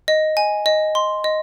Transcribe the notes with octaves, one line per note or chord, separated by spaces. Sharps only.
D#5
G#5
D#5
C6
D#5